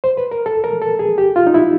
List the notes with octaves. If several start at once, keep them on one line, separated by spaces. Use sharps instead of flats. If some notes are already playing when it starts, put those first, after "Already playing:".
C5
B4
A#4
A4
A#4
A4
G#4
G4
F4
D#4
E4